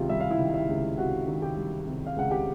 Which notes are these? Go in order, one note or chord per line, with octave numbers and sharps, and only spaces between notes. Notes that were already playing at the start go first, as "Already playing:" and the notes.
Already playing: C#2 C3 D#3 F4
G3 E5
F5
E4 E5
D#3
E4 E5
C#2
C3 F#4 F#5
D#3
G4 G5
G3
C3
F5
C#2 F#5
G4 G5